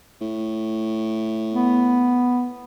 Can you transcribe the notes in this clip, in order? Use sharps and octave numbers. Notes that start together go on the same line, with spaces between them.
A2
B3